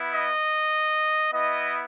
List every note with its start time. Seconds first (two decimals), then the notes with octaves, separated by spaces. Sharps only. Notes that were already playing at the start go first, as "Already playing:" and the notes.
Already playing: B3 E4
0.14 D#5
1.33 B3 E4 D#5